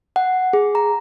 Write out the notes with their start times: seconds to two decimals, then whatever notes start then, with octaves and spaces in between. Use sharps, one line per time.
0.16 F#5
0.53 G#4
0.75 A#5